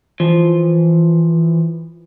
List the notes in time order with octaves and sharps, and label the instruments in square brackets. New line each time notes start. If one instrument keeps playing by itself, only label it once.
[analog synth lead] E3 [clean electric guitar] F3